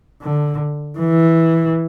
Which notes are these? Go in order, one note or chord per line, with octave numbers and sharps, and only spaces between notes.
D3
E3